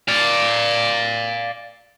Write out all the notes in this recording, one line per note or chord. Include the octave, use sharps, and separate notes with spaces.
D5 F5